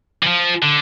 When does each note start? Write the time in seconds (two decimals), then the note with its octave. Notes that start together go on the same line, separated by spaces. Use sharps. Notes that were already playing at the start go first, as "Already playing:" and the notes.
0.23 E3
0.27 F3
0.63 D3